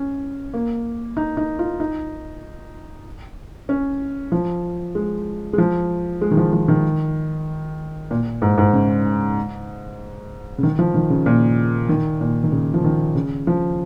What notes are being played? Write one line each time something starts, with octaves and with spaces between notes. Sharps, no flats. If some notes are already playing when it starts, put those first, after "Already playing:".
Already playing: C#4
A#3
D#4
D#4
F4
D#4
C#4
F3
G#3
G#3
F3
G#3
D#3
F3
F3
D#3
A#2
G#2
G#2
C#3
C#3
D#3
F3
D#3
C#3
A#2
D#3
A#2
D#3
C#3
F3
D#3
C#3
F3